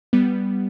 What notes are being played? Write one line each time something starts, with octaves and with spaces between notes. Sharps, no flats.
G3 B3